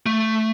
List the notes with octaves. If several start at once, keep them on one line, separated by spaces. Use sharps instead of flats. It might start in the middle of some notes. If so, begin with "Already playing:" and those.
A3